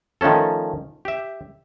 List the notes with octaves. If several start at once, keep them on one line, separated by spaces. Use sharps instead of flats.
D#3 F3 A3 C#4 A4
G4 E5